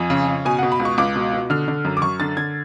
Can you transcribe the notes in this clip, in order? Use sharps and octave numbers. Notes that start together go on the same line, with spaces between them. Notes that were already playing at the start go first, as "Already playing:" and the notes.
Already playing: F2 G#5
C#3
C#3
B2 G#5
B2 F#5
B5
C#2
C#6
C#2 D6
B2
B2
D3 F6
D3
F#2
D6
F#2 C#6
D3 A6
D3 G#6